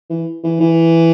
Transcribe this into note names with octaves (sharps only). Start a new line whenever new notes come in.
E3
E3
E3